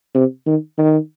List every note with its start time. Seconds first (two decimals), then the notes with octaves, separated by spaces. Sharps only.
0.15 C3
0.46 D#3
0.78 D#3